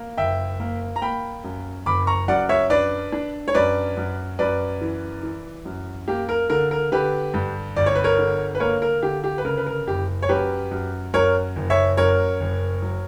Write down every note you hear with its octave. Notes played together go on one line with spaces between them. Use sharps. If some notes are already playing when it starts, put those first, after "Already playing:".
Already playing: A#3
F#1 E5 G5
A#3
A#5
A#3 G5 B5
F#2
F#1 B5 D6
A#5 C#6
F#2 D5 F#5
C#5 E5
D4 B4 D5
D4
C#5
F#2 B4 D5
F#2
F#2 B4 D5
E3
E3
F#2
A#3 G4
A#4
D3 A#4
A#4
D3 G4 B4
G2
G1 D5
C#5
B4
A#4 C#5
D3
B4
A#3 A#4 C#5
A#4
D3 G4
G4
B4
C#3 A#4
B4
A#4
F#1 G4
C#5
F#2 G4 B4
F#2
F#2 A#4 C#5
F#1
C#5 E5
F#2 A#4 C#5
F#1
F#3